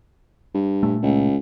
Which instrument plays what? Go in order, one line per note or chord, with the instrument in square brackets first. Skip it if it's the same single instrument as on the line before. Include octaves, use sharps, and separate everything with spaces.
[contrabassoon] G2
[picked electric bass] A#2 A3
[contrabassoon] C#2